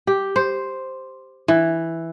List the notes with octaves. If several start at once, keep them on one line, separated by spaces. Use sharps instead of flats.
G4
C5
E3